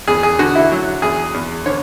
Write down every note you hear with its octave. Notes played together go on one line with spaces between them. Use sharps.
E2 G#4
G#4
D3 F#4
E4
F#3
E2 G#4
E2
D3 C#5